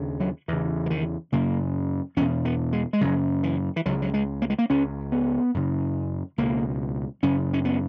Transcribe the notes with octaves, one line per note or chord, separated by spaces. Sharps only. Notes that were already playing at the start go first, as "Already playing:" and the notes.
Already playing: D#2 C#3
F#3
E2 C#3 E3
E3
D#3
F#2 C#3 A#3
E2 B2 C#4
B3
G#3
G#3
F#2 C#3 F#3
E3
E3
C#2 C#3 F#3
F#3
G#3
A#3
G#3
A#3
C#2 C#3 C#4
B3
F#2 C#3
C#2 B2 A#3
F#2 C#3 C#4
C#4
B3